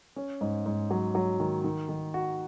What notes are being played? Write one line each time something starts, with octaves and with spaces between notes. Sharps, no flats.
C#4
G#2
G#2
F#3
F#3
D#3
D#3
D#3
F#4